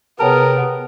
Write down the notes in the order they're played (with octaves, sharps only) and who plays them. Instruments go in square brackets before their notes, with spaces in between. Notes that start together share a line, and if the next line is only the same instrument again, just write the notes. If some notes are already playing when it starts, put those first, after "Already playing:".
[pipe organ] C3 G5 [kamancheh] B3 [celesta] G#4 C#5 A5 [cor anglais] A#4